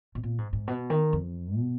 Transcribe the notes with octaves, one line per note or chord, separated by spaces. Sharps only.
B2
A#2
G#2
G#2
B2
D#3
F2
B2